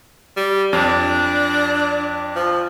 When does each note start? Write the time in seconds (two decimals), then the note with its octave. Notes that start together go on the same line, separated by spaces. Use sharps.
0.37 G3
0.73 F2 D4
2.36 F3